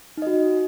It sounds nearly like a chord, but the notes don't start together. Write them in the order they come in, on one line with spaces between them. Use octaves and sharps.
D#4 D#5 F#4